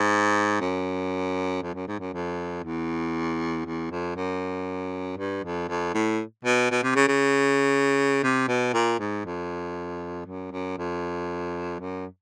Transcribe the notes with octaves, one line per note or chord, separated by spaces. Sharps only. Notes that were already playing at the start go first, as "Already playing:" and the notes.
Already playing: G#2
F#2
F2
F#2
G#2
F#2
F2
E2
E2
F2
F#2
G2
F2
F2
A2
B2
B2
C3
C#3
C#3
C3
B2
A#2
G#2
F2
F#2
F#2
F2
F#2